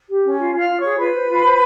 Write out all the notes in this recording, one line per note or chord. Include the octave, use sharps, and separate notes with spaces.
G4
C#4
F4
F4 F5 F6
F4
G#4 C#5 C#6
F4 B4 B5
C5
F4
C5